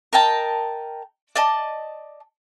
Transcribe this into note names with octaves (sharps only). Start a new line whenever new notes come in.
A#4 D#5 G5 A5
D5 D#5 A5